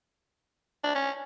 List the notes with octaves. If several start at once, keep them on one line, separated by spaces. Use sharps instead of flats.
D4
C#4